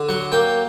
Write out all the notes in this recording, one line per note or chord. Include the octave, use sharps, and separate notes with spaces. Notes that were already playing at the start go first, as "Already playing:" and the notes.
Already playing: D3
F#3 F#5
A#3 G5